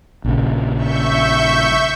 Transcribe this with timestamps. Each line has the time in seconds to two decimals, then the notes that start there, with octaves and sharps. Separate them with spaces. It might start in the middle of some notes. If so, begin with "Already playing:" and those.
0.24 A#1 C#3
0.76 E5 C#6 G6